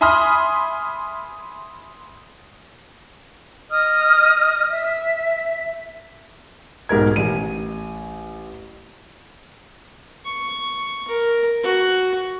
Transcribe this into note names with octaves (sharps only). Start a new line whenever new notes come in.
E5 G#5 B5 C6 D#6 F6
D#5 D#6 F6
E5
B1 G#2 A#4 G#6
A1 D#7
C#6
A#4
F#4